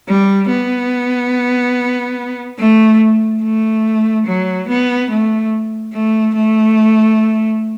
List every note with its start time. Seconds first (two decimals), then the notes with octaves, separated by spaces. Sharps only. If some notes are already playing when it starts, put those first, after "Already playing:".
0.08 G3
0.50 B3
2.59 A3
3.43 A3
4.27 F#3
4.68 B3
5.10 A3
5.94 A3
6.35 A3